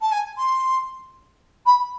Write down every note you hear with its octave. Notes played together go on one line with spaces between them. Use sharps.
A5
G#5
C6
B5